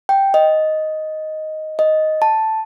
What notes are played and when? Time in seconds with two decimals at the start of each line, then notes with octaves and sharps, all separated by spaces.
0.09 G5
0.34 D#5
1.79 D#5
2.22 A5